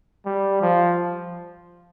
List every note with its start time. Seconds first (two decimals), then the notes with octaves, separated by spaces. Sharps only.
0.26 G3
0.62 F3